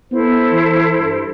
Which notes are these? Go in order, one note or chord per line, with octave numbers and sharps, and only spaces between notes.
B3 E4 A4 C5
E3
G2